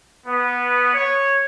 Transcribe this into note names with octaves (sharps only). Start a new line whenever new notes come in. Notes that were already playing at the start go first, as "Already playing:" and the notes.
B3
C#5